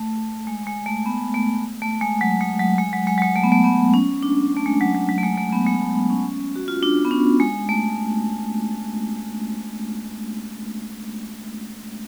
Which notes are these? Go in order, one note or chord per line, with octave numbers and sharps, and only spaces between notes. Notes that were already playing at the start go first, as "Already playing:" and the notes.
Already playing: A3
G#3
G#3
A3
B3
A3
A3
G#3
F#3
G#3
F#3
G#3
F#3
G#3
F#3
G#3
A3
B3
A3
B3
C#4
D4
A3
G#3
F#3
F#3
F#3
A3
G#3
A3
B3
G#3
A3
B3
C#4
F#4
F4
D4
B3
C#4
G#3
A3